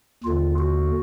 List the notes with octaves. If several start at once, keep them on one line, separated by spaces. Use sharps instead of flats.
D#2 D3 F4
F#4